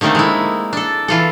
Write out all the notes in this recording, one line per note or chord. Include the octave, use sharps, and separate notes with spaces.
D3 D#3 A3 A#3 C4
G#3 E4
D4 A4
E3 F4 A4